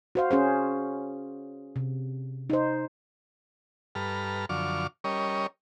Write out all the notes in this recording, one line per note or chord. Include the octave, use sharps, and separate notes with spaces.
F#4 C5 F5
C#4 G#4 C5
C3
D#4 C5
G2 A4 B4 A#5 F6
F#2 D3 F3 C#6 D6 F6
G3 C#4 A#4 C#5 D#5